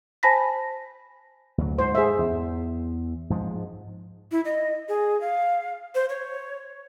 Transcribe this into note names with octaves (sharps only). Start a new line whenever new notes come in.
C5 G#5 A5 B5 A#6 B6
D2 F#3
G#2 C5
G#4 C5 E5
E2
G#2 F3 G#3
E4
D#5
G#4
F5
C5
C#5